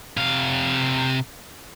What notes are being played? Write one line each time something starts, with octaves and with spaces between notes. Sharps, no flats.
C3 F5